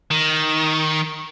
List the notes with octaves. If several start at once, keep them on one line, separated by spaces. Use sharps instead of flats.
D#3